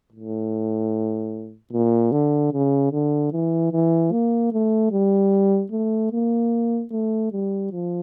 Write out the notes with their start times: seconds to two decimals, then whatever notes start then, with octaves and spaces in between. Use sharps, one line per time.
0.13 A2
1.73 A#2
2.12 D3
2.53 C#3
2.92 D3
3.32 E3
3.73 E3
4.12 A#3
4.52 A3
4.92 G3
5.72 A3
6.12 A#3
6.92 A3
7.32 G3
7.72 F3